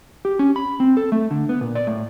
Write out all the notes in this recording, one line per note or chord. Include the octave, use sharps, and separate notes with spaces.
G4
C#4
B5
C4
A4
A3
D3
B3
A#2
D5
A2